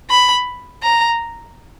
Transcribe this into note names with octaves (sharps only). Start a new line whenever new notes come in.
B5
A#5